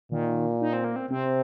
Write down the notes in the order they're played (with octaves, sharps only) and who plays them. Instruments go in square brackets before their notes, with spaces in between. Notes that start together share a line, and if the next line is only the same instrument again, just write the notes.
[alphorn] A#2 [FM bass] D#3
[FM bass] D#4
C4
A#3
C4
[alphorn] C3 [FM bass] C4